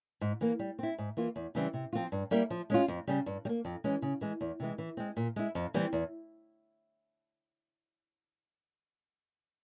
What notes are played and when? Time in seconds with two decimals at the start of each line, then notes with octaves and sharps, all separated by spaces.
0.21 G#2
0.41 E3 A#3
0.59 G3
0.79 C4 E4
0.98 G#2
1.17 E3 A#3 F4
1.36 E2
1.55 C#3 E3 G3 C4
1.74 C3
1.93 F3 C4 F4
2.12 G2
2.31 G3 A#3 E4 A#4
2.50 F3
2.70 G#3 C#4 F4
2.88 F2
3.07 C#3 G3
3.26 G2
3.45 G3
3.49 A#3
3.65 F2
3.84 E3 G#3 C#4
4.02 C#3
4.21 E3 G#3
4.41 E2
4.60 C3 E3 G#3
4.78 E3
4.97 G#3 C4
5.17 A#2
5.36 G#3 E4
5.55 F2
5.74 E3 G3 C4
5.93 E2